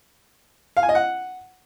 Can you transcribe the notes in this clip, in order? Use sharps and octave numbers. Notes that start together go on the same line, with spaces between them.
F5
G#5
D#5
F#5